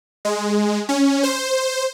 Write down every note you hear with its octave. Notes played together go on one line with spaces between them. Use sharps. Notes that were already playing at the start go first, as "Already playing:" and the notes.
G#3
C#4
C5